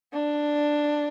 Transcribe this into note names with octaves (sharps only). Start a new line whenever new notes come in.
D4